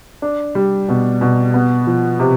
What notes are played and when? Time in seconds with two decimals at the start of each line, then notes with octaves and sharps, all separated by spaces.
0.22 D4
0.55 G3
0.89 B2
1.21 B2
1.54 B3
1.87 F3
2.20 C3